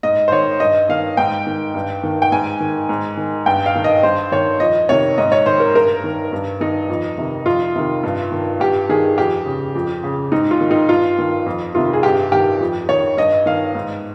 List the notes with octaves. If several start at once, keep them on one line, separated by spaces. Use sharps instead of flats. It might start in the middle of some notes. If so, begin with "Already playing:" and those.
G#2 D#5
C5
D#3 C#5
G2 D#5
D#3 F5
G#2 G5
D#3
G2
D#3
G5
G#2 G#5
D#3
G#2
D#3
G2 G5
F5
D#3
D#5
G2 C5
D#3 C#5
F2 D#5
C3 D#3 C#5
G#2 D#5
C#5
D#3 C5
A#4
G2 A#4
D#3
G2
D#3 D#4
F2
C3 D#3
F2 F4
C3 D#3
G2
D#3
G2 G4
D#3 G#4
F2 G4
C#3
F2
C#3
G#2 D#4
F4
D#3
D#4
G2 F4
D#3
F2
C3 D#3 F4
G#4
G2 G4
D#3 G4
F2
D#3 C#5
G2 D#5
D#3 F5
G#2